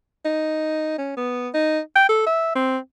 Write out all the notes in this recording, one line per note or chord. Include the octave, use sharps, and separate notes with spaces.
D#4
C#4
B3
D#4
G5
A4
E5
C4